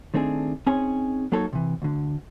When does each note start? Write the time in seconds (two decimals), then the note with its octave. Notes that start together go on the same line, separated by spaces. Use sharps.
0.14 D#3 A3 C4 D4 G#4
0.66 C4 C#4 D#4 G#4 C#5 G#5
1.32 F#3 A#3 D#4 A4 A#4 C#5
1.53 C3 E3
1.82 D2 D3